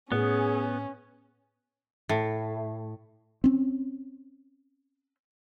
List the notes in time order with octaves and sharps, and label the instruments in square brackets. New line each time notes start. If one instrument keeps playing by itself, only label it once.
[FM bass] A2 [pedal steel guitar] B3 [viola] C#4 [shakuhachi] G#4
[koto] A2
[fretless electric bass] C4 C#4